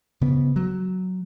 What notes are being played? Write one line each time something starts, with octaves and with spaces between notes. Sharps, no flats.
C#3 B3
F#3